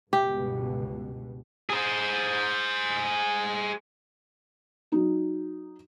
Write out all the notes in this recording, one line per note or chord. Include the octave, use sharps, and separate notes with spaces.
G1 C#2 B2 G4
G#4 C5
F#3 D#4